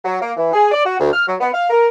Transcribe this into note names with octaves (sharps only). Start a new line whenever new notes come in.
F#3
A#3
E3
G#4
D5
F#4
D2
F6
F#3
B3
F5
A#4